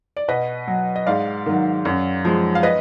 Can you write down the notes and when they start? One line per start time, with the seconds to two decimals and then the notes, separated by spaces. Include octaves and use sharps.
0.17 D5
0.28 B2 B4 D#5
0.67 F#3
0.96 D#5
1.06 G#2 D5 F5
1.46 D#3 F#3
1.85 F#2
2.25 F3 G#3
2.55 F5
2.63 B4 D#5